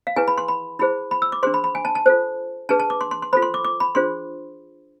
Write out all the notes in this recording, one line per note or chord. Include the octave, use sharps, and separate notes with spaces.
F5
E4 G#4 B4 G#5
B5
C6
B5
E4 G#4 C5 B5
B5
E6
D6
D4 G#4 C5 C6
B5
B5
G#5
A5
A5
F4 A4 C5
D4 G#4 B4 A5
A5
D6
C6
C6
C6
F4 A4 C5 B5
C6
D6
D6
B5
D4 F4 G#4 C5 C6